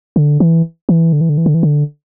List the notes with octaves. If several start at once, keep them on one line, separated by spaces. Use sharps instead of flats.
D3
E3
E3
D3
E3
D3
E3
D3
E3
D3